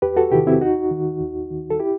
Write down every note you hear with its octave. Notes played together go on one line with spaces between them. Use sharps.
E2 G4 B4
F#4 A4
C3 D#3 E4 G4
C4 E4
D#2 D#4 F#4
D#3
D#2
D#3
A4
E4 G4